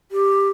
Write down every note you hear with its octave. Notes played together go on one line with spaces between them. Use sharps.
G4